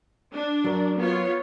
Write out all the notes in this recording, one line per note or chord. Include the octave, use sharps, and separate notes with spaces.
D4
F#3 A#4
B3 F4 C#5